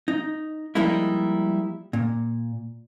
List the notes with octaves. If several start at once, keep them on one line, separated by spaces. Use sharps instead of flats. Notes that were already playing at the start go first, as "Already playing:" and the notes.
D#4
F3 G3 G#3 A#3 D#4 E4
A#2